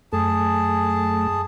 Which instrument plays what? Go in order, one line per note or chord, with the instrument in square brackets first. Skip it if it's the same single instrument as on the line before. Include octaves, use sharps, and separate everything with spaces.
[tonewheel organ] F#2 A3 [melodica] G#4 A5